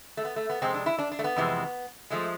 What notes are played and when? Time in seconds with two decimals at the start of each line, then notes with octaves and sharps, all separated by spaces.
0.17 A3
0.25 B3
0.36 A3
0.49 B3
0.62 F2 C3 G#3 C4
0.74 D4
0.86 E4
0.99 D4
1.12 D4
1.19 A3
1.24 B3
1.36 F2 C3 E3 G#3
2.10 F3 G#3 A3